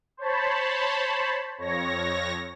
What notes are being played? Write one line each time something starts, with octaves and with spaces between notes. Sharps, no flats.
C5 C#5 A5 B5
F2 C#5 A#6